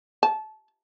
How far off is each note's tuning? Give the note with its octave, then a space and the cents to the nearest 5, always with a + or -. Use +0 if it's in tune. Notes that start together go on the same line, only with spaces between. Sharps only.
A5 -20